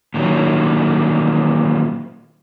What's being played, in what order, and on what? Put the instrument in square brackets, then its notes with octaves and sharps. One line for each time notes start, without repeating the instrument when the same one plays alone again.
[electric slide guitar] A#2 D#3 F#3